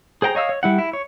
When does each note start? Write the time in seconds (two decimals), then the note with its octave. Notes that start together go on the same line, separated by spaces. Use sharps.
0.22 G#4 C5 G5 A#5
0.35 C#5 D#5 F5 E6
0.49 C#5
0.63 G3 E4 F#5
0.79 E4
0.93 C#5